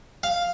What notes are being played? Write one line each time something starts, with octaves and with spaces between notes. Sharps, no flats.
F5